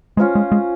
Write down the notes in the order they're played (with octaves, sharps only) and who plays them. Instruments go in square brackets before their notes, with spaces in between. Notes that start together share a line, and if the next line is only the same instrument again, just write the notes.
[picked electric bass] G#3 [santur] C#4 F4 C5
[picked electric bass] G#3
G#3